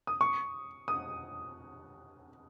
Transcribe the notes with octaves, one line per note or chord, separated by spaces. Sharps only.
D#6
C#6
D#6